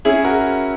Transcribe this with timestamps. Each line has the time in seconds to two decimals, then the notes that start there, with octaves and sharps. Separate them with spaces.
0.05 C#4 E4 G#4
0.24 F#4 A#4